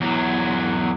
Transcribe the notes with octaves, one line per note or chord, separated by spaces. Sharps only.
E2 F#3